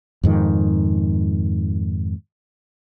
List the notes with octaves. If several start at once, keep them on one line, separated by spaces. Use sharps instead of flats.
F2 G#2 D#3